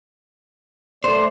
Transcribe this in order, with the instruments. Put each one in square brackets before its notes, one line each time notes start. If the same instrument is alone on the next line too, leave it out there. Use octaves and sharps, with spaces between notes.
[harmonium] A3 D5 [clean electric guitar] C5